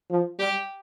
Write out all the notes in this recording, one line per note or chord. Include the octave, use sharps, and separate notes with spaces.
F3
G3 G4